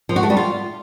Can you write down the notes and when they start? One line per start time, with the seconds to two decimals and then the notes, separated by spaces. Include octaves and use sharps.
0.09 F3
0.16 F#4
0.23 A3
0.30 G3
0.37 F4